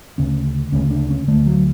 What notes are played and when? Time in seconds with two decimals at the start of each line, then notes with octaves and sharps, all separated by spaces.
0.18 D2 C#3 C#4
0.72 D2 C#3 C#4
0.91 D4
1.10 C#4
1.27 D2 D3 A3
1.46 F#3